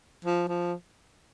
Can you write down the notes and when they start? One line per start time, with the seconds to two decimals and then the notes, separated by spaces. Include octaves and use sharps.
0.25 F3
0.48 F3